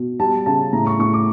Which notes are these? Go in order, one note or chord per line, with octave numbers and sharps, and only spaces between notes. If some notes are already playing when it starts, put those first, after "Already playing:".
Already playing: B2
G3 A5
C#3 A5
A2 A#5
C#6
A2 C#6
D6